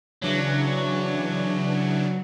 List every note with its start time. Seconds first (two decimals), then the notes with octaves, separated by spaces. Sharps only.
0.22 C#3 E3 F#3 D4